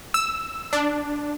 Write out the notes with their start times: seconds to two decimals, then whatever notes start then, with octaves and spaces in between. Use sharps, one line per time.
0.14 E6
0.73 D4